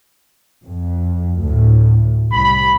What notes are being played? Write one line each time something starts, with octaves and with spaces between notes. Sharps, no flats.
F2
D2 A2
C2 B5